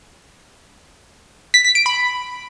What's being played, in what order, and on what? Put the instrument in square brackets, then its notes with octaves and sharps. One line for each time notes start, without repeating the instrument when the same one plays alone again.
[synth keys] B6
B6
D7
B5